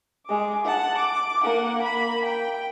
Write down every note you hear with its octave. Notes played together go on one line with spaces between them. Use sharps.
G#3 D6
F#5 A5
D6
A#3 F#5
A#3 B5
G5